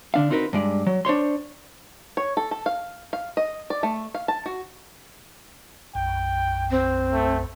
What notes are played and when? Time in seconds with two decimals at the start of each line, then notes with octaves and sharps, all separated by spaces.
0.14 D3 D4 F5
0.30 C4 D#4 F#4 A#4 B4
0.53 G2 G#3 D5
0.86 F#3
1.05 D4 C5 C#5 C6
2.17 C#5
2.37 A4
2.51 A4
2.66 F5
3.13 F5
3.37 D#5
3.70 D5
3.83 A3
4.15 F5
4.28 A5
4.46 F#4
5.95 B1 F#2 G5
6.71 C4
7.12 A3